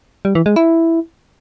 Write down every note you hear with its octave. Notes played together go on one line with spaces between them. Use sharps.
G3
E3
G#3
E4